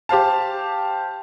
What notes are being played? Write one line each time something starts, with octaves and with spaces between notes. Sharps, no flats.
G4 C5 F5 A5